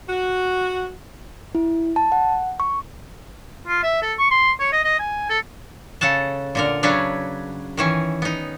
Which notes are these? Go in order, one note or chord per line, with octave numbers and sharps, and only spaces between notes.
F#4
E4
A5
F#5
C#6
F4
E5
A4
C#6
C6
C#5
D#5
D#5
G#5
A4
C#3 A4 F#5 A5
A#2 D3 A#4
C#3 F#3 C#4 D4 B4
D#3 E3 C#4
B3 D#4